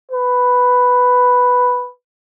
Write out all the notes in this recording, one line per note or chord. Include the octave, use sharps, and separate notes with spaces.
B4